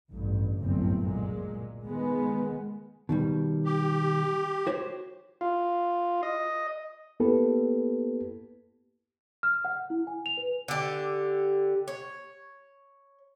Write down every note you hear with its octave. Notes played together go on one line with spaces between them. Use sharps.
A1 G2
G1 C2 F#2 A2 C4
A#2 G#3
D#3 G#3 B3
B2 D#3 G3
G4
F#4 C5 C#5
F4
D#5
A#3 B3 E4 G4 A4 B4
F6
F#5
E4
G#5
F7
B4
D3 G4
C#5